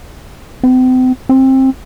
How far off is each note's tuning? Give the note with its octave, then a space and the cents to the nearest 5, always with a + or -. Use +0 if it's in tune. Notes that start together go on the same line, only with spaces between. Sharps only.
C4 -40
C4 +20